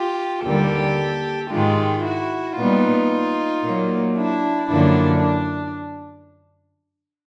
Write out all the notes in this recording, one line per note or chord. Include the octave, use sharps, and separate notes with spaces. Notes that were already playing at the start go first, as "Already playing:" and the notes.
Already playing: F4 G4
D#2 D3 G3 A#3 G4 A4
G#2 D#3 G#3 F4 G4
E4 F#4
A#2 G3 B3 D#4 F4
A#2 F#3 A#3
D4 E4
F#2 D3 F3 A#3 D4 E4
D4